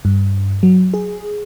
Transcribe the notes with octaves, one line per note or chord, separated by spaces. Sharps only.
G2
F#3
G#4